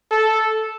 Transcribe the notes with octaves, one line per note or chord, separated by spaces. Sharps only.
A4